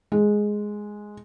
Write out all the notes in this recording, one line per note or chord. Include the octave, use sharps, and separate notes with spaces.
G#3